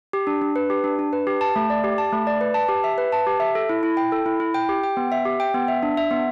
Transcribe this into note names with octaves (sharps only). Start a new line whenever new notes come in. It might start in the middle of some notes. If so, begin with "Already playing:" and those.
G4
D4
D4
B4
G4
D4
D4
B4
G4
A5
A3
D5
G4
A5
A3
D5
B4
A5
G4
E5
B4
A5
G4
E5
A4
E4
E4
G5
A4
E4
E4
G5
G4
G5
B3
E5
G4
G5
B3
E5
D4
E5
B3